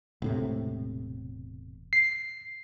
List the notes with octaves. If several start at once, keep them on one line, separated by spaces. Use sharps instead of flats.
E1 A2 C3
C7